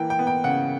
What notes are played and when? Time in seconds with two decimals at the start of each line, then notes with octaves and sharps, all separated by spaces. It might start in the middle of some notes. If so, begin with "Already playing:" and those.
Already playing: E3 A#3 G5
0.10 G5
0.19 B3
0.27 G5
0.44 C#3 F#5